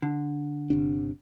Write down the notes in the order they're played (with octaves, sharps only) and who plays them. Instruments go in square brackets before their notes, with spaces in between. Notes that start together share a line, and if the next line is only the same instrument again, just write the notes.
[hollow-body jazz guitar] D3
[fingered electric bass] G1 C3 D4